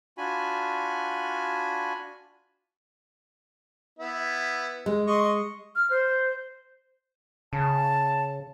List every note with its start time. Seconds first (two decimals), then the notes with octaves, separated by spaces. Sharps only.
0.18 D4 F4 F#4 G#5 B5
3.99 B3 E4
4.86 G#3
5.07 D#5 C6 C#6
5.75 F6
5.90 C5
7.53 C#3 A5